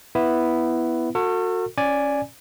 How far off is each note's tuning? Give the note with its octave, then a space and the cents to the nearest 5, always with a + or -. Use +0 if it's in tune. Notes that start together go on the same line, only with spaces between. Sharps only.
B3 +0 E4 +0
F#4 -25 A4 +40
C#4 -5 D5 +0 G#5 +0